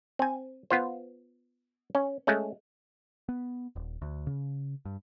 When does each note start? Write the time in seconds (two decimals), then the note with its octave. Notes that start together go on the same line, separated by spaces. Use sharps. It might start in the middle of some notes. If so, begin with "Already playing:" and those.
0.19 C4 G#5
0.70 B3 F4 C5
1.95 C#4
2.27 G#3 A3 C#4
3.29 B3
3.76 D#1
4.02 D2
4.27 C#3
4.85 G2